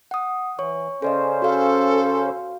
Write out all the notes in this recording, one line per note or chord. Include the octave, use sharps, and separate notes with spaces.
F#5 D#6
E3 C#5 C#6
C#3 C#4 A4 C5 D5 D#5
F#4 A4 F5